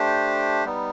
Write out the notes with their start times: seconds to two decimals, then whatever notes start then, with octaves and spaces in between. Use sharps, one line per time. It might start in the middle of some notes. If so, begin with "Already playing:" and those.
Already playing: A3 D4 G4 C5
0.65 G3 B3 D#4